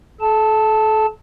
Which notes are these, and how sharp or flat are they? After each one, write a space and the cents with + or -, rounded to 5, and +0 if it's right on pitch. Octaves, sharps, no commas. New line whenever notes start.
A4 -35 A5 +0